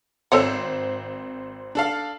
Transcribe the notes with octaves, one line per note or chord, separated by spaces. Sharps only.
G#1 C4 A4 C5 C#5 F#5
D4 A4 F5